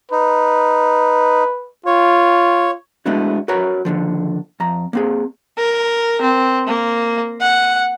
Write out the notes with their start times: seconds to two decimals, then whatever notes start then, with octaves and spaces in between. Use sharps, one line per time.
0.12 D#4 B4
1.86 F4 C#5
3.06 G#3 A3 B3 D4 E4 F#4
3.48 F#4 A#4 B4 C#5 A#5
3.85 D#2 B2 D3 F3
4.60 F2 A#5
4.93 A#3 C4 G#4
5.58 A#4
6.21 C4
6.67 A#3
7.41 F#5